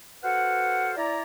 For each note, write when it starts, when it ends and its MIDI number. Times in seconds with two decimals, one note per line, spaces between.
0.24 0.92 66
0.24 0.92 69
0.24 0.92 71
0.24 0.92 72
0.24 0.92 77
0.24 0.92 78
0.96 1.22 64
0.96 1.22 74
0.96 1.22 82